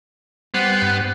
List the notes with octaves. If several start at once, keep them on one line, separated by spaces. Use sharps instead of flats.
G3 B3 C5 F#5
G2